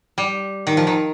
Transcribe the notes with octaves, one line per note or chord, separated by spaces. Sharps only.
G3
D#3
F3
D#3